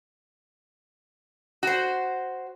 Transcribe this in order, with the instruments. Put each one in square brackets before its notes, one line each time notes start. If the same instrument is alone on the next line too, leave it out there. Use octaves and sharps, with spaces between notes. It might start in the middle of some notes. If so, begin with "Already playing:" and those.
[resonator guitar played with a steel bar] F#4 C5